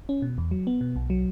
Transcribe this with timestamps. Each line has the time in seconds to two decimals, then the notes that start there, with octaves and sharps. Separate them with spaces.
0.09 C#4
0.22 B2
0.38 E2
0.51 F#3
0.67 B3
0.81 B2
0.96 B1
1.10 F#3